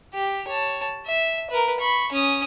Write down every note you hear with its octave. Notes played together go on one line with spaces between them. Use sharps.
G4
C#5 A5
E5
A#4 B4
B5 C#6
C#4 D#6